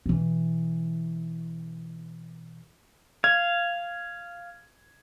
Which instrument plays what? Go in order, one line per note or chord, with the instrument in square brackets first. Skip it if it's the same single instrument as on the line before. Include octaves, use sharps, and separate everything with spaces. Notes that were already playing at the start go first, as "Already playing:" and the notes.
[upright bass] B2 E3
[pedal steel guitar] F5 [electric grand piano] G#6